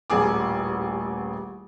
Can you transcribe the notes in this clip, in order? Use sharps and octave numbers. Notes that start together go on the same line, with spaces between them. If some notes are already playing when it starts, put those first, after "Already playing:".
D#1 A1 G#4 D6